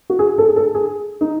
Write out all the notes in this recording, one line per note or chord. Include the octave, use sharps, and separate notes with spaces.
F#4
G#4
A4
G#4
A4
G#4
D#4